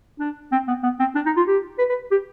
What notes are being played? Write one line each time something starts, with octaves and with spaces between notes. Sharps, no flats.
D4
C4
B3
B3
C4
D4
D#4
F4
G4
B4
B4
G4